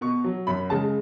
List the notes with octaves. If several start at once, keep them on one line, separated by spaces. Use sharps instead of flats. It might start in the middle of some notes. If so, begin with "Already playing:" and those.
B2 C#6
F#3
F#2 B5
C#3 G#3 A5